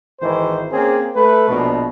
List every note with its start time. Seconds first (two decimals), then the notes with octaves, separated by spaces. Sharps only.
0.20 G#1 D#3 E3 C5
0.72 A#3 C4 C#4 G#4
1.15 A3 B4
1.49 A#1 B2